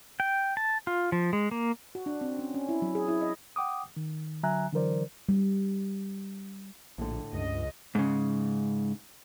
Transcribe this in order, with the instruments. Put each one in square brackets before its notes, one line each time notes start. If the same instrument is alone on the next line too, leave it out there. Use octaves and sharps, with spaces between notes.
[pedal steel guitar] G5
A5
F4
F3
G#3
A#3
[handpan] F#4
D4
C4
C#4
C#4
E4
F#3
G#4
E4
D#5
[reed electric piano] F#5 G5 D6 D#6
D#3
D3 F#3 E5 G#5 A#5 F#6
D3 E3 F#3 A#4 C5 D5
[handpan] G3
[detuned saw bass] A#1 [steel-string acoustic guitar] A2 D3
[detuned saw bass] C#2 [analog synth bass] G2 [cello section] D#5
[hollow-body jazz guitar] G#2 C#3